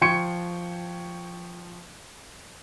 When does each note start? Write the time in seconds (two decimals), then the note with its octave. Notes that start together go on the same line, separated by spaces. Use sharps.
0.01 F3 G5 C6 C#6 G#6 C#7